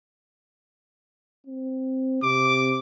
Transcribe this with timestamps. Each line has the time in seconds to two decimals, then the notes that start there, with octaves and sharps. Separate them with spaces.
1.47 C4
2.23 C3 D6